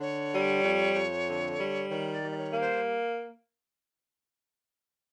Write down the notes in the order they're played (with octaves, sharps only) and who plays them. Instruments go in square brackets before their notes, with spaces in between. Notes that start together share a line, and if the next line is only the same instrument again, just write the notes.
[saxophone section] D3 [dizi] C#5
[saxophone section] G3
F2
F2
D3
G3
[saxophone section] D#3 [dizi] C#5
[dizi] D5
[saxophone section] G3
[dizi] D5
C#5
[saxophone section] A#3
[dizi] C5